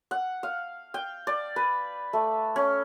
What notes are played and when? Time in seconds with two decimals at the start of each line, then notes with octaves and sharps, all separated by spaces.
0.11 F#5
0.43 F5
0.94 G5
1.27 D5
1.56 B4
2.13 A3
2.56 C#4